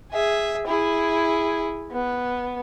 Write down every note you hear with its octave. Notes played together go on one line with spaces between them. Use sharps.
G#4 E5
E4 G#4
B3